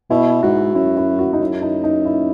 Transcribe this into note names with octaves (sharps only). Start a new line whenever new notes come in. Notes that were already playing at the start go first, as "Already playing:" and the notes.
B2 E4
G#2 F#4
F#2 E4
E4
F#4
D#4
F#2 E4
D#4
D#4
E4